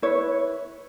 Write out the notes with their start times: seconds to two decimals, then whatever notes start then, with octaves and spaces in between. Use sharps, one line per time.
0.02 E4 B4 C#5